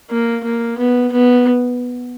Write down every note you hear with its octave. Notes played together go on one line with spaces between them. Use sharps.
A#3
A#3
B3
B3